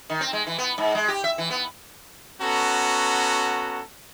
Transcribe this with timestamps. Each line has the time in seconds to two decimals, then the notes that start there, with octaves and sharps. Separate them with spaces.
0.10 D#3
0.21 C4
0.33 G#3
0.47 E3
0.58 B3
0.78 G#2
0.95 G#3
1.08 G4
1.24 E5
1.38 E3
1.51 B3
2.41 B3 C#4 F#4 A4 A#5